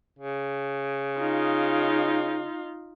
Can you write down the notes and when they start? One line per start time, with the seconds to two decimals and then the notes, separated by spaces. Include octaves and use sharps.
0.19 C#3
1.18 D#4 F4